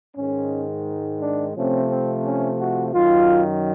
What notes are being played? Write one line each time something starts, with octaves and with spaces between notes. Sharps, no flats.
G#2 D#3 G#3 C#4
D4
C3 F3 A3 C4 C#4
C4
C#4
F#4
F#2 D#3 F#3 F4